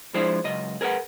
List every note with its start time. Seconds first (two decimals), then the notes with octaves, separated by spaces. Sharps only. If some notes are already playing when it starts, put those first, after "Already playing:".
0.14 F3 G#3 D4 E4 C5
0.44 C#2 F#2 D#5
0.81 G#4 A#4 B4 F#5